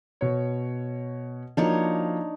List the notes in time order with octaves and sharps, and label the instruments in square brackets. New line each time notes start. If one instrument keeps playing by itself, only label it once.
[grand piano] B2 C#5
[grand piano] F3 A#3 F#4 [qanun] D4 D#4 C#5